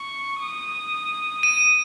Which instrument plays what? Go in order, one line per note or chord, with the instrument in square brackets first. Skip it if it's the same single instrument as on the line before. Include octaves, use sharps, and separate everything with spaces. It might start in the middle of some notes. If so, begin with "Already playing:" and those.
Already playing: [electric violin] C#6
D#6
[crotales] D#7